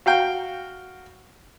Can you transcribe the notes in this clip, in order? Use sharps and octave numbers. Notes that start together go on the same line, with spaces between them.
F#4 F5 G5